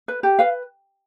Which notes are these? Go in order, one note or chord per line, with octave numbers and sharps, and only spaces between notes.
B4
G4
B4 F5